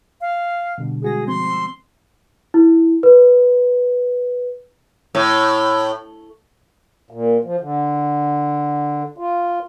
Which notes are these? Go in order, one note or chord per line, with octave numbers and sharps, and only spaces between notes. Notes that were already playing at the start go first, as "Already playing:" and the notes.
F5
B2 D3 G3
G#3 F#4 G#4 A#6
F3 C4 C6
E6
E4
B4
A2
A#2
F3
D3
F4